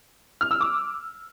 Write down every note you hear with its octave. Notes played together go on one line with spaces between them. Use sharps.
F6
E6
D6